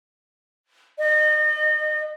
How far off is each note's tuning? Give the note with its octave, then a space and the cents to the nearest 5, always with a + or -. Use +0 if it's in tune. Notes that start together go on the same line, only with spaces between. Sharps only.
D#5 -35